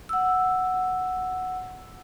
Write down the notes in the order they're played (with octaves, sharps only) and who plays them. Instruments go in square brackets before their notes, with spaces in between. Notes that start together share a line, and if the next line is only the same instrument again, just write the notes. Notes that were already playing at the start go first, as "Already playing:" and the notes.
[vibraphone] F#5 E6